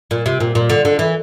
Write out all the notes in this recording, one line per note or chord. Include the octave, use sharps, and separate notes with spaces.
A#2
C3
A#2
A#2
D3
D3
E3